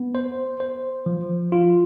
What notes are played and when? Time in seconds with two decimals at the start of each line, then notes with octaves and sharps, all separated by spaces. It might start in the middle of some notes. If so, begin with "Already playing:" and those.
Already playing: B3
0.15 C5
0.60 C5
1.06 F3
1.52 F4